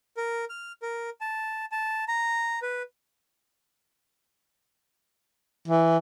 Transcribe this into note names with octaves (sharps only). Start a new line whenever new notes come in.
A#4
F6
A#4
A5
A5
A#5
B4
E3